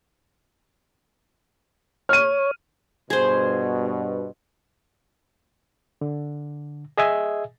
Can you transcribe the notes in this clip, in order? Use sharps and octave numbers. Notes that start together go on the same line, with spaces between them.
C#5 F6 D#7
G2 B2 G#4 C5
D3
G#4 D#5 E5 G#5